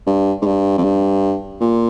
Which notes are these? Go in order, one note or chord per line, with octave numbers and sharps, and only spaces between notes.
G2
G#2
G2
F2
G2
A#2